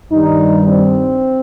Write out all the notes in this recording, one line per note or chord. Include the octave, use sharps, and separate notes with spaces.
G2 D#3 G3 D#4
C4